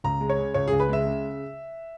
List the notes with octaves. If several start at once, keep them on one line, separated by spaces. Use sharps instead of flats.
C#2 A#5
G#3
C#5
C#3
C#2 C#5
C#2 G#4
B4
G#3 E5
C#3